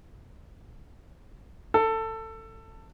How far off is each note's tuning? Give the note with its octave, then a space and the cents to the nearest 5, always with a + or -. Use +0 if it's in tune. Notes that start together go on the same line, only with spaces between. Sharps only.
A4 +20